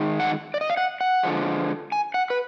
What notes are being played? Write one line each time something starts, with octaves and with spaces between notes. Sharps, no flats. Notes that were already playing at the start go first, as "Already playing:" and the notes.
Already playing: D#3 G#3
F#5
D5
D#5
F5
F#5
F#5
D3 F3 G#3
G#5
F#5
B4